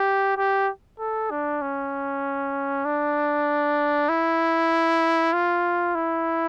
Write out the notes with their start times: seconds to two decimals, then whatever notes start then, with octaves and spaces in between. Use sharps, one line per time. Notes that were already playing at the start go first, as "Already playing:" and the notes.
Already playing: G4
0.37 G4
0.99 A4
1.30 D4
1.62 C#4
2.85 D4
4.09 E4
5.33 F4
5.95 E4